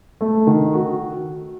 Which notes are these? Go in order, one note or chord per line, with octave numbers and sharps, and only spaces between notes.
A3
D#3
F#4